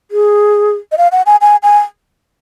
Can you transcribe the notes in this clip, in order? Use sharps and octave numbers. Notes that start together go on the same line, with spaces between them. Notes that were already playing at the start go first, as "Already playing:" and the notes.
G#4
D#5
F5
F#5
G#5
G#5
G#5